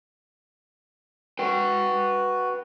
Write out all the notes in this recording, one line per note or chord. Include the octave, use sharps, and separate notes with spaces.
F#4 B4 G5